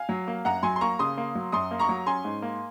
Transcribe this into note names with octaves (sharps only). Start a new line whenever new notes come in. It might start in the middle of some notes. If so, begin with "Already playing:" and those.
Already playing: F5 G#5
F#3
A#3
F#2 F#5 A#5
F#3 G#5 C6
C6
A#3 A#5 C#6
C#3 C6 D#6
A#3
F#3
F#2 C6 D#6
A#3
A#5 C#6
F#3
C#4 G#5 C6
G#2
A#3